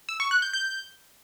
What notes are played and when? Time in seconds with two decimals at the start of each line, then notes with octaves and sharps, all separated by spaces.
0.09 E6
0.20 C#6
0.31 F#6
0.42 G6
0.53 G6